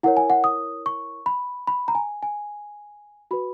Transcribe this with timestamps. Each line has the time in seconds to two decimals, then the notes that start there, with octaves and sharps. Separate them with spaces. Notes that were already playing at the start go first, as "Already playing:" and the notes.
0.03 E4 A#4 C#5 F#5
0.17 G#5
0.30 F#5
0.44 D#6
0.86 C#6
1.26 B5
1.68 B5
1.88 A#5
1.95 G#5
2.23 G#5
3.31 F#4 B4 B5